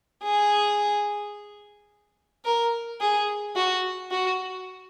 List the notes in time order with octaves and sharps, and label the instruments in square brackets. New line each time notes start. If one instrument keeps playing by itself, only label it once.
[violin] G#4
A#4
G#4
F#4
F#4